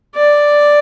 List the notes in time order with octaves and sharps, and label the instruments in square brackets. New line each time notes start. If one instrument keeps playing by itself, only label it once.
[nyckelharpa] D5